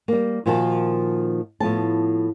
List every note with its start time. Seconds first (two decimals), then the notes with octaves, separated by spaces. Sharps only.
0.08 G3 A#3
0.46 A#2 D#3 F3 F#4 F5 A5
1.60 A2 F3 B3 A5